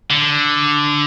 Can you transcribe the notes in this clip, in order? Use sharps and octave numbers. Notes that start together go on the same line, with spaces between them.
D3